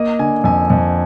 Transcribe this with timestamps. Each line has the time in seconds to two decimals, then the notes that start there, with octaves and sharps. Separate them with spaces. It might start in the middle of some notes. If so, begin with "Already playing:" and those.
Already playing: A#3 D#5
0.19 D3 G#5
0.44 F2 G#5
0.70 F2